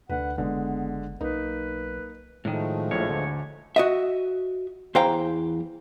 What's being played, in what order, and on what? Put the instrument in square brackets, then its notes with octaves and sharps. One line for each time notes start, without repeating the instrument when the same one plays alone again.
[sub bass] D2 [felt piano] D3 B4 [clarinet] F#5
[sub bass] F#1 [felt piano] D3 G#3 [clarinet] B3
[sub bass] B1 [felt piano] A#3 D#4 [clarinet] B4
[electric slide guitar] A2 D#3 [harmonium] F3 G#3 A3
[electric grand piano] A#1 A2 [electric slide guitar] C#5
[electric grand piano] D2 D3
[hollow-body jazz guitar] F#4 D#5 E5
E2 E3 C5 F5 G5 A#5